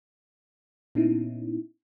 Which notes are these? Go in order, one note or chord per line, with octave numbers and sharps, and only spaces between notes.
A#2 B3 C#4 D#4 E4